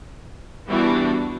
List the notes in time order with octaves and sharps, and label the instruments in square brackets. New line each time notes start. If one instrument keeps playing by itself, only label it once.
[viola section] E3 G3 B3 D4 F#4